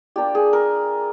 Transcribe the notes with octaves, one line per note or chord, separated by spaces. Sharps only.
A#3 D4 F4 G4
G#4
A#4